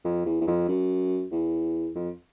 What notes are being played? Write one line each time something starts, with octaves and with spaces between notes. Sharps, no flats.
F2
E2
E2
F2
F#2
E2
F2